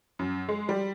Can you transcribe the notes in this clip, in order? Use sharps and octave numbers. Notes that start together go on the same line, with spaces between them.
F#2
G#3
G3